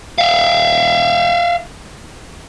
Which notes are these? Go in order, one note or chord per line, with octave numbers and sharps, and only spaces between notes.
E5 F5